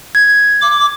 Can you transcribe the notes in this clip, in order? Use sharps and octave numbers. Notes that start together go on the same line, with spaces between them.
G#6
D6